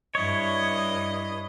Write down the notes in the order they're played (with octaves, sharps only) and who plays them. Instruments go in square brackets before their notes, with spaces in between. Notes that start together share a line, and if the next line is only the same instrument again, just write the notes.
[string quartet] G2 D#5 [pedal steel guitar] E4 C#5